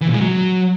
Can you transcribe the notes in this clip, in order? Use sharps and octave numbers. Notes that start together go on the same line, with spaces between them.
E3
A#2
G#3
F#3